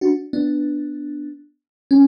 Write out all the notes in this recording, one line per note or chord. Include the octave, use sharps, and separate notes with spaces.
D4 F#4
B3 D4
C#4